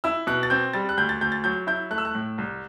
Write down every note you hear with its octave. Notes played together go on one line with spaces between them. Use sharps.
E4 E6
B2 F#6
A6
C4 G6
G3 A6
F#6
D2 G6
A6
D2 G6
A6
F#3 G6
E4 G6
A3 F#6
E6
F#6
A2
C2